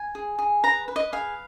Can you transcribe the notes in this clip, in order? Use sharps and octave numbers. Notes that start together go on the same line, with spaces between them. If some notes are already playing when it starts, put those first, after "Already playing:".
Already playing: G#5
G#4
G#4
B4 A#5
B4
D#5
G#4 F5